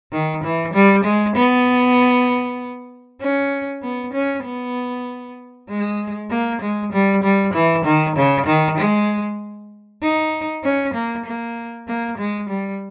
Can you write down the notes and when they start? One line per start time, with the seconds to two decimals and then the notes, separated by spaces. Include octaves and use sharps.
0.13 D#3
0.44 E3
0.74 G3
1.05 G#3
1.36 B3
3.21 C#4
3.83 B3
4.14 C#4
4.45 B3
5.70 G#3
6.31 A#3
6.62 G#3
6.93 G3
7.24 G3
7.54 E3
7.85 D#3
8.16 C#3
8.47 D#3
8.78 G#3
10.02 D#4
10.64 C#4
10.94 A#3
11.25 A#3
11.88 A#3
12.18 G#3
12.49 G3